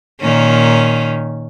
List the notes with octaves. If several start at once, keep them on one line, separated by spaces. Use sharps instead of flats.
A#2 D#3 C#4